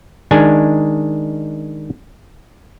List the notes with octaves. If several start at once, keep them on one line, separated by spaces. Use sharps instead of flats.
D#3 G#3 D4 G#5